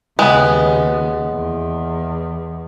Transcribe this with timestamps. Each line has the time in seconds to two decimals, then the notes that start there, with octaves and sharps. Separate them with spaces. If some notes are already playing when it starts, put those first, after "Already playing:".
0.19 D#2 C#3 G#3 B3
1.32 E2